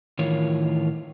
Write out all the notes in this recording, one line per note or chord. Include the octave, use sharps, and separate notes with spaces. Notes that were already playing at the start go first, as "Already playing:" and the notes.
A2 D#3 E3 F4 A#4 C#5